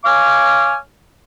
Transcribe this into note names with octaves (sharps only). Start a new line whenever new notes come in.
C#5 F5 G#5 D6 F6